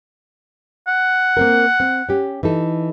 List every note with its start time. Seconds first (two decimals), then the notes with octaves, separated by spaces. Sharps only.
0.88 F#5
1.37 A#3 C4 A#4
1.80 C4
2.09 C#4 G4
2.43 E3 D#4 A4